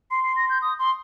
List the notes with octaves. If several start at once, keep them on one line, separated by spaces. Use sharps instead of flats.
C6 C7
C7
A#6
G6
D#6
C6